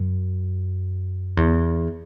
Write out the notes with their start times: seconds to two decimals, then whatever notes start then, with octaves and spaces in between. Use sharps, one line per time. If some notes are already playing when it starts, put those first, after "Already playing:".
Already playing: F#2
1.37 E2